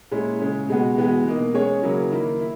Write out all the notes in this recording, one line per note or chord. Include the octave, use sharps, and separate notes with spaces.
A#2 G#3 C#4 E4
C#3 G#3 C#4
B2 G#3 B3 F#4
E3 G#3 B3 F#4
B2 A#3 D#4
G#3 C#4 G#4 C#5
C#3 F#3 A#3 E4
D#3 A#3 E4
E4